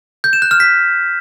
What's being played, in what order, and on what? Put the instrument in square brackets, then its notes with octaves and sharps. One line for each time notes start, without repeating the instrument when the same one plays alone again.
[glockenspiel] G6
E7
F#6
F6
B6